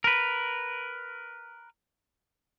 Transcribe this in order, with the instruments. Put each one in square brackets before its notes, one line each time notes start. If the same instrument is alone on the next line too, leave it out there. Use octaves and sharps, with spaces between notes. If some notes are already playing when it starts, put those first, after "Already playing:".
[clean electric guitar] A#4 B4